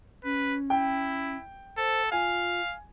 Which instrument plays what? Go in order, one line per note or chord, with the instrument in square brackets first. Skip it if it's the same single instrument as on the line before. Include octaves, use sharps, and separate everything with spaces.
[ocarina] C#4 [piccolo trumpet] B4
[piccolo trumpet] E4 [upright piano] G5
[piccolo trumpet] A4 [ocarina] C5
[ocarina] F4 [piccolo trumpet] F5 [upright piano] G#5